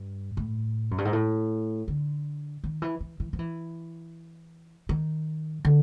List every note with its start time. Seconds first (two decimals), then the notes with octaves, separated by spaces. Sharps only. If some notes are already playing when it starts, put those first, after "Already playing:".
Already playing: G2
0.37 A2
0.91 F#2
0.98 G2
1.05 G#2
1.13 A2
1.88 D3
2.64 D#3
2.82 E3
3.00 E3
3.20 E3
3.33 F3
3.39 E3
4.89 D#3
5.65 D3